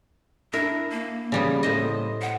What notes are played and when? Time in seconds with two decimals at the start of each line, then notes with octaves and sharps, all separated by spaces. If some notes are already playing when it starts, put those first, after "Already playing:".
0.53 D4 E4 A#4
0.91 A#3
1.32 C#3 G3 B3
1.63 A2 C5 D#5
2.22 F#5